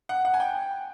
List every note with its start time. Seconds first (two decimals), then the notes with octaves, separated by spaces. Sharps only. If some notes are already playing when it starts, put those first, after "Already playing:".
0.09 F#5
0.25 F#5
0.34 G#5
0.40 G5